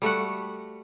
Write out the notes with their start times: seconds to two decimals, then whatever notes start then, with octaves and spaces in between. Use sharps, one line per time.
0.02 G3 A3 F#4 F#5